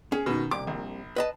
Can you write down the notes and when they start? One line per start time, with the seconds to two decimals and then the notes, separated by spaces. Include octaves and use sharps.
0.12 C#4 G#4
0.26 B2 D#3
0.51 C2 D6
0.67 A#1
1.16 B4 D#5 A5